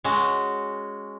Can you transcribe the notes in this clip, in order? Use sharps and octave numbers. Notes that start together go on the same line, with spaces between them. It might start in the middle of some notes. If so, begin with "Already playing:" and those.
G#3 C#4 F#4